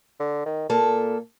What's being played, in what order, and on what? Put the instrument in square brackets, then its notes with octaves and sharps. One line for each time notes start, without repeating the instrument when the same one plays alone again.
[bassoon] D3
D#3
[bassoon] A#2 [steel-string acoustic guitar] A#3 A4